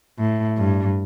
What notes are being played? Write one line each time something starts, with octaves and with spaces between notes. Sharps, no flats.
A2
G2